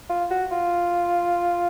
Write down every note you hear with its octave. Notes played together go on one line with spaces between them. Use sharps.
F4
F#4
F4